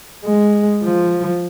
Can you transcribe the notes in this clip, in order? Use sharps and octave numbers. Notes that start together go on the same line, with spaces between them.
G#3
F3